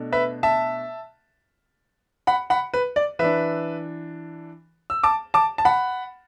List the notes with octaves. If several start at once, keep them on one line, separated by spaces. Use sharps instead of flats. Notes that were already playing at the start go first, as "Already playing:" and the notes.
Already playing: B2 A3 D4
B4 E5
E5 A5
F#5 B5
F#5 B5
B4
D5
E3 D4 B4 E5
E6
A5 D6
A5 D6
A5
F#5 B5